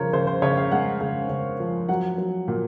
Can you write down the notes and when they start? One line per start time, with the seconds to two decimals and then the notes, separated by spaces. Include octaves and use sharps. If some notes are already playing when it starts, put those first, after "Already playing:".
Already playing: C#3 F3 A#4 C5 C#5
0.13 C#3 C5
0.27 C5
0.42 C#3 C#5
0.57 F5
0.71 G#3 F#5
1.01 C#3
1.29 C#3
1.60 F3
1.89 F#3 F#5
2.18 F#3
2.48 A#2